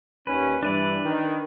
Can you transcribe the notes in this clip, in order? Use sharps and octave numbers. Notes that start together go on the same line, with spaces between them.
D#2 A#2 C#4 B4
G2 E3 D4 B4 D5
D#3